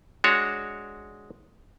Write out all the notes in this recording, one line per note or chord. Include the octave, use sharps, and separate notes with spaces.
G#3 D4 F#4 C#5